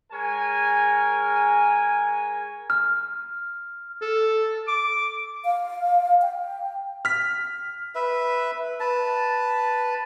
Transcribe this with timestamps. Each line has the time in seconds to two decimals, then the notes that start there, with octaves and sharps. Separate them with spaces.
0.13 G#3 A#4 C#5 G#5
2.70 F6
4.02 A4
4.68 D6
5.44 F5
6.22 G5
7.05 F6 B6
7.95 B4 E5
8.80 B4 A5